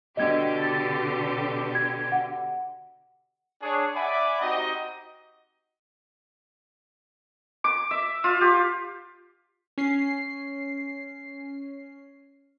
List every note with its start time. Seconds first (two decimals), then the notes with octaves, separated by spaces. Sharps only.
0.17 B2 D3 G4 D#5 G#6
0.62 A6
1.75 G#6
2.12 F#5
3.62 D4 G#4 C#5
3.95 D5 E5 F#5 G#5 B5 D6
4.41 C4 D#4 F#4 G4 D#5
7.64 D6
7.91 E5
8.24 F4
8.41 G4
9.78 C#4 C7